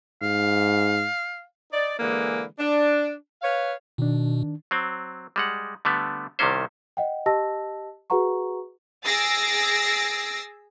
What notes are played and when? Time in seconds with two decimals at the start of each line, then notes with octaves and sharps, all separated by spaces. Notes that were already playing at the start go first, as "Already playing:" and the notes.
0.22 G#2 F5
1.73 D#4 D5
1.99 D3 E3 G#3 A#3
2.59 D4
3.42 B4 C#5 F5
3.98 B2 D#3 D4
4.71 F#3 C4
5.36 G3 G#3 F#5
5.85 D3 G3 A3 B3
6.39 C2 C3 D#3 G3 C#4 C5
6.97 D#5 F#5 G5
7.26 G4 D#5 A5 E6 A#6
8.10 F#4 G#4 B4 F#5 A#5 C#6
9.04 G#4 E6 A6 A#6 C7 D7